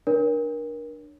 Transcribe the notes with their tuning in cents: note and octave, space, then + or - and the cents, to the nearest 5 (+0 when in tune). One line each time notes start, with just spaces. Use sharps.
D4 +20 A#4 +30 C#5 +10